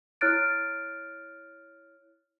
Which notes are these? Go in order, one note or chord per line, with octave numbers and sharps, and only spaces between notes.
E4 C#5 F6 F#6 A6 D7